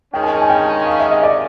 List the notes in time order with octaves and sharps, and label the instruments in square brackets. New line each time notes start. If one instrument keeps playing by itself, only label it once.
[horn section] D#3 G#3 C#4 [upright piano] G5
[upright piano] G#5
A5
G#5
G5
F5
E5
D#5
D5